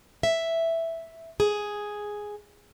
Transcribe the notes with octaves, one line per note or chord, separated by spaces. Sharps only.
E5
G#4